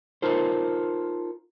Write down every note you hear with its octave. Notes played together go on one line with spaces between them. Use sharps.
D#4 F4 A4 A#4 C5